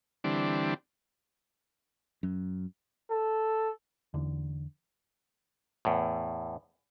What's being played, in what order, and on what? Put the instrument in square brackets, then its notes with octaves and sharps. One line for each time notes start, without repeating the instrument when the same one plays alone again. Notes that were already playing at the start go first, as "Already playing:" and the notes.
[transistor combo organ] D3 E3 G3 C4 D4
[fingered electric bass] F#2
[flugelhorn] A4
[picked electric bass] E2 D3
[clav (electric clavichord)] E2 A2